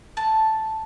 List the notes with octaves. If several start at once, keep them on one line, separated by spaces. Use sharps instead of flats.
A5